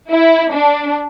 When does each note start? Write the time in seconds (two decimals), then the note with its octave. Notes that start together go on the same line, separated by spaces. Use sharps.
0.11 E4
0.53 D4